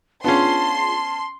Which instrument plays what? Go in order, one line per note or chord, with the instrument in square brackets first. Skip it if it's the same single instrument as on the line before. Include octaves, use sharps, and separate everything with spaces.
[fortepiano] B3 C#4 [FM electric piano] D4 F4 G#4 [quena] A5 [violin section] C6